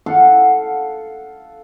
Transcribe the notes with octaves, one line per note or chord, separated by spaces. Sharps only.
A4 F5 F#5